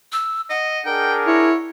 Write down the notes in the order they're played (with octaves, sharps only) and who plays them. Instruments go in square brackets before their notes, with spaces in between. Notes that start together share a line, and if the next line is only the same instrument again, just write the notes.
[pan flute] E6
[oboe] D#5 [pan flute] F#5
[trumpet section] D4 G#4 A#4 [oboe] G5
[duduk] E4 [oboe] C#5